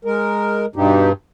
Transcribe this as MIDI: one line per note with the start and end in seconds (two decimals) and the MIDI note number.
0.05 0.66 56
0.05 0.66 70
0.76 1.12 43
0.76 1.09 47
0.76 1.09 63
0.76 1.09 67